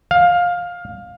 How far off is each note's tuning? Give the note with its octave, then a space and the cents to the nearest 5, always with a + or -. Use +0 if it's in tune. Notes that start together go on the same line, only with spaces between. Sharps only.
F5 +15